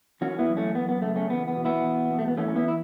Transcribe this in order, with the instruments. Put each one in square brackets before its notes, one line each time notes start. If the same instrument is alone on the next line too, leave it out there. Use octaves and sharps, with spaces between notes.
[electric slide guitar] E3 C#4 F#4
B3 E4
F#2
A3 C#4
F#2 B3
B3
C#3 A3
A3 C#4
E2 B3
B3
B2
B3 E4
E2
B2
A3
B3
E3 A3 C#4
C#4
B3 E4
E4